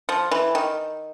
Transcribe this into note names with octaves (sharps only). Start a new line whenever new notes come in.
F3
E3
D#3